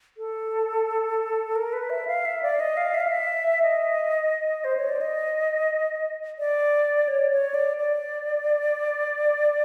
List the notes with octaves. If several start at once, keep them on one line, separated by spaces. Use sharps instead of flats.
A4
A#4
B4
E5
F5
E5
D5
D#5
F5
E5
F5
E5
D#5
C5
C#5
D5
D#5
D5
C#5
C#5
D5
D5